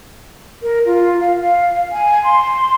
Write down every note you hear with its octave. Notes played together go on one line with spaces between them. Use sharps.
A#4
F4
F5
F5
G#5
C6